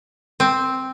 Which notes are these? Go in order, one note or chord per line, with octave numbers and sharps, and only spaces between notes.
C4